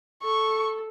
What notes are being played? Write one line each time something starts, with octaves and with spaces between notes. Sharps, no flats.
A4 C#6